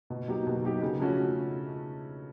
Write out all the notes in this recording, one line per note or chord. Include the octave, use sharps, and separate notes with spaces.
B2
F#3 A#3 D#4 G4
B2
F#3 A#3 D#4 G4
C#3
F3 A3 C#4 F#4